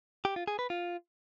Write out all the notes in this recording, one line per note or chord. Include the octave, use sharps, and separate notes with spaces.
G4
F4
G#4
B4
F4